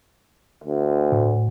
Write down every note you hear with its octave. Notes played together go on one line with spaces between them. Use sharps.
D2
A2